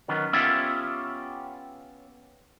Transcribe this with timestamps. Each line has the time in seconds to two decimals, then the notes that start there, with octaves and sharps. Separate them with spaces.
0.08 D#3 F#3 B3 C#4
0.33 B3 C#4 F4 G4 C#5 E5